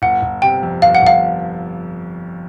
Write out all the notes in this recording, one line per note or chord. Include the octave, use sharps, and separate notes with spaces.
G1 F#5
G1
C3 G5
F2
G1 F5
F#5
G1 F5